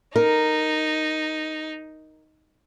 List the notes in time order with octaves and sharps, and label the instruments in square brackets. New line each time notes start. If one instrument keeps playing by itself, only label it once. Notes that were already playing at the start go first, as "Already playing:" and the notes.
[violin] D#4 [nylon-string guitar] A#4